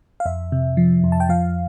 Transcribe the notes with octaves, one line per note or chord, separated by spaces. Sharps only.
F5
F2 E5
C3
F3
F2
A5
G5
F3 F5